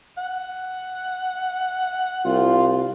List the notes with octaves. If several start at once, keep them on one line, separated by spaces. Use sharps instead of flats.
F#5
C2 F4